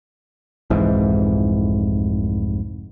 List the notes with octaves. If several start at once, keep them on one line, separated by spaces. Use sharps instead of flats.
F1 C2 G#2 E3